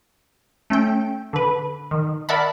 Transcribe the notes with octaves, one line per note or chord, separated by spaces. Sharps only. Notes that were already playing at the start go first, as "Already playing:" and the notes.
A3 C#4 A4 G5
D3 B4
D#3
A#4 D5 E5 F#5 A5 B5